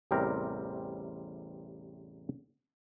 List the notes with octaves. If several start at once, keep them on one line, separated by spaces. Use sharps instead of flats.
A1 E2 C3 G3 C4 A#4